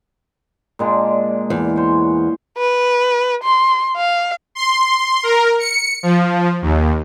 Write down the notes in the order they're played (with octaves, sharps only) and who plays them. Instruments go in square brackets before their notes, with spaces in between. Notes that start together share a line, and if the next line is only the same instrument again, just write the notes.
[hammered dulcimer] A#2 G#3 D4
[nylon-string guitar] E2
[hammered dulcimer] C5 C#5
[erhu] B4
C6
F5
[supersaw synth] C6
A#4
C#7
F3
D#2